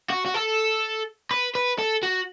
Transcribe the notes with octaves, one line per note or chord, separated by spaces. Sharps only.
F#4
F#4
A4
B4
B4
A4
F#4